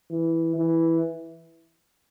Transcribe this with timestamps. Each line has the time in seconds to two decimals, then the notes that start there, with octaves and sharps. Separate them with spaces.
0.10 E3
0.56 E3